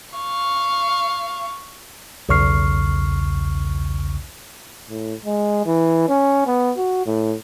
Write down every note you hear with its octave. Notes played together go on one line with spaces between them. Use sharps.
F5 C#6
B1 E2 C#3 C#6 F6 C7
A2
G#3
E3
C#4
B3
F#4
A2